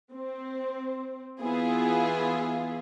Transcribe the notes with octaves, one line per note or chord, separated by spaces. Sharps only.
C4
E3 B3 E4 F4 G#4